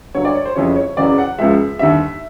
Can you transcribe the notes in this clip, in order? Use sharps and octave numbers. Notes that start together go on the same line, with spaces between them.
G2 D3 F#3 C#5
D5
C#5
C5
F2 C#3 E3 G3 C#5
C#5
E2 C#3 F#3 D5
F#5
C#2 C#3 F3 G#3 E5
D#2 D3 G3 E5